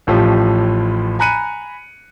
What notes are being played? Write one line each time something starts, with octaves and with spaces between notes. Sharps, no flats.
A1 A2 F3 F4 G4
G#5 A#5 B5 F#6 C#7 D#7